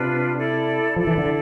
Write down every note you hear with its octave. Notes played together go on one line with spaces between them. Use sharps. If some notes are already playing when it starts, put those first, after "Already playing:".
Already playing: C3 D4 F4 B4
E4 A4 D5
F3 E4 A4 D5
E3
D3